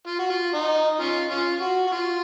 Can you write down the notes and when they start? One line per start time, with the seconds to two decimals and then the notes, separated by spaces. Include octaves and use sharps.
0.07 F4
0.19 F#4
0.30 F4
0.55 D#4
1.01 C#4 F4
1.31 C#4 F4
1.61 F#4
1.87 F#4
1.92 F4